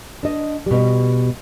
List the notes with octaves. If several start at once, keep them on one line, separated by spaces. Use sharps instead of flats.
D4 D#5
B2 G3